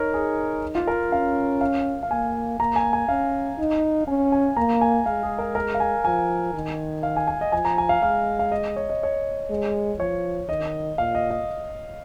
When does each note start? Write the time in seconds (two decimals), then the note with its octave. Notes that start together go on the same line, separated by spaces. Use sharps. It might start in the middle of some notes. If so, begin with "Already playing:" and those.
Already playing: D#4 A#4 C#5
0.14 G#4
0.75 F4
0.88 A#4
1.11 C#4 F5
1.61 F5
2.03 F5
2.11 A#3 G#5
2.60 A#3 A#5
2.76 G#5
2.93 G#5
3.08 C#4 F5
3.59 D#4
4.07 C#4 G#5
4.32 G#5
4.57 A#3 A#5
4.81 G#5
5.06 G#3 F5
5.23 G#4
5.39 A#4
5.55 A#4
5.74 F5
5.80 G#5
6.05 F3 G#5
6.54 D#3
7.03 F5
7.16 G#5
7.28 G#5
7.41 D#5
7.52 F3 G#5
7.65 A#5
7.78 G#5
7.89 F5
8.02 G#3 F5
8.39 F5
8.52 D#5
8.76 C#5
8.90 D#5
9.03 C#5
9.50 G#3
9.99 F3 C#5
10.49 D#3 D#5
10.98 A#2 F5
11.15 D#5
11.30 D#5